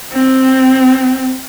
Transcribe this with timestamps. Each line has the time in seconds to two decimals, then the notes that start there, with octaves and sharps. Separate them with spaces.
0.12 C4